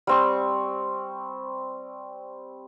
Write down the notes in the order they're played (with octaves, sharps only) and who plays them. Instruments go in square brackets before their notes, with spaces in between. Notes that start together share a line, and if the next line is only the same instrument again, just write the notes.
[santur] G3 C4 C#6